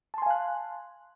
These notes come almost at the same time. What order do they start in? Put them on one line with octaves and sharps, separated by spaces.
A5 C6 G#5 F5 F#6